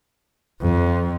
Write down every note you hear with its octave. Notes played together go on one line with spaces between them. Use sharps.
F2